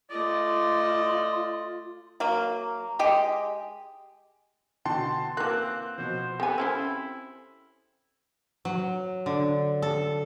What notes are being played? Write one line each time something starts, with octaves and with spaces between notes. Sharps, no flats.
A3 F4 D5 D#5
F#3 A#3
G#3 G4 D#5
B2 D3 E3 G5 A5 C6
E3 A#3 C4 F#4 D6 F#6
B2 F3 C5
B3 C4 G4 A4 G#5
C4 C#4 E4 C5
F#3
D3
A4